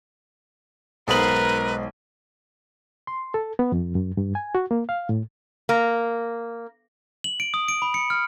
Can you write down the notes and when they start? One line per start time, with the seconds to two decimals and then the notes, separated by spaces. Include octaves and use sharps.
1.08 B1 G#2 G#3 A#4 B4 A#5 F#7
3.07 C6
3.34 A4
3.59 B3
3.72 F2
3.95 F#2
4.17 G2
4.35 G#5
4.55 F#4
4.71 A#3
4.89 F5
5.09 A2
5.69 A#3
7.24 F#7
7.40 D7
7.54 D#6
7.68 D7
7.82 B5
7.94 C#7
8.10 F6